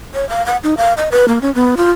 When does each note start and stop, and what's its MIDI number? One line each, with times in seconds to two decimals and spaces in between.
0.14 0.27 73
0.29 0.45 77
0.46 0.57 78
0.64 0.75 63
0.77 0.93 77
0.97 1.09 75
1.12 1.26 71
1.28 1.39 58
1.42 1.53 61
1.55 1.75 59
1.77 1.92 65